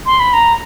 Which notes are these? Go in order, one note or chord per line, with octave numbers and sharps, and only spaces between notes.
C6
B5
A#5